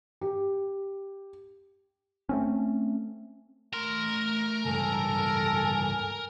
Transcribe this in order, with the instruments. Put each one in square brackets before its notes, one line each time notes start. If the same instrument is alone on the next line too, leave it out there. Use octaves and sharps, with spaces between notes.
[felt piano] G4
[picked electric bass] A3 C4 C#4
[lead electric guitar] A3 C6 [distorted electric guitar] A#4
[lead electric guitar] C#2 G2 [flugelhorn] A4 [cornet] G#5